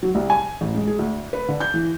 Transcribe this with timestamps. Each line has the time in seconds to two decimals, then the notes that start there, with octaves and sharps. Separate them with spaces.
0.03 F#3
0.15 C2
0.30 G#5
0.61 A1
0.75 G#3
0.87 G#4
0.99 D2
1.33 B4
1.49 D3
1.60 G6
1.74 E3